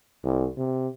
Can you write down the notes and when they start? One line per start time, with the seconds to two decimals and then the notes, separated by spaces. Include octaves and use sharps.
0.24 C2
0.57 C3